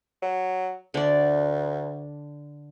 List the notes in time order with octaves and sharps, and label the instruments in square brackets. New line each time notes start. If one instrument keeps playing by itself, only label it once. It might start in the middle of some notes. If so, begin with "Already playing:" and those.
[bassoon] F#3
[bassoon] D2 [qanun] D3 D5